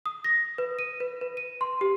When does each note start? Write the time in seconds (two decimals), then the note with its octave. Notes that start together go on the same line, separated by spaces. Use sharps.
0.06 D#6
0.24 A#6
0.58 B4
0.79 D#7
1.00 B4
1.21 B4
1.37 D#7
1.61 C6
1.81 G4